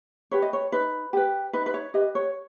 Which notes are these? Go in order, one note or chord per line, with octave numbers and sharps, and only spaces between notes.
G4 B4 C#5
D#5
C#5
D#4 B4
G4 B4
D#4 B4
B4
C#5
G4 B4 D#5
C#5